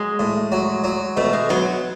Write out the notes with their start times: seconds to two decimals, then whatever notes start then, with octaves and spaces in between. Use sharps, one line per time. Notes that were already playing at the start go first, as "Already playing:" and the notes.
Already playing: F#3 G#3
0.19 A2
0.52 F#3
0.84 F#3
1.17 B2 A3
1.33 G#3
1.49 F#3 B3